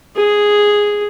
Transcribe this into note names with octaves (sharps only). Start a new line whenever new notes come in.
G#4